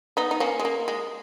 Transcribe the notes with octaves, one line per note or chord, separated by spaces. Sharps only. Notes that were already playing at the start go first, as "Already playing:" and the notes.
B3 D#4
D#4
A#3 C#4
G#3
A#3
G#3